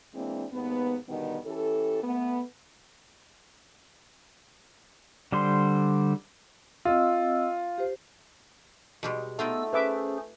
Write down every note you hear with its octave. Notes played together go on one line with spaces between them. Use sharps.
E3 G#3 A#3 C4 D4
D#2 G#2 B3
B2 D3 D#3 G3 B3
E3 C#4 G4 A4
A3 B3
D3 G3 C5 C6
C4 F4 D#5 E6
G4 C5
B2 G3 G#3
A3 B3 C4 D#4 F4 E6
C#4 G#4 B4 C5 E5 D6